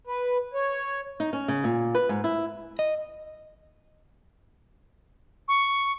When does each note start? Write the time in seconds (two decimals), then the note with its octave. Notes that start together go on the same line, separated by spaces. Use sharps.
0.07 B4
0.54 C#5
1.20 D#4
1.33 C#4
1.48 C#3
1.64 A#2
1.95 B4
2.09 G#2
2.24 E4
2.79 D#5
5.48 C#6